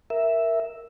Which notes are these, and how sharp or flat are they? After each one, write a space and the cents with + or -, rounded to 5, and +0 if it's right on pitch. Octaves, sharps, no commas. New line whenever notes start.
A#4 +0 E5 +0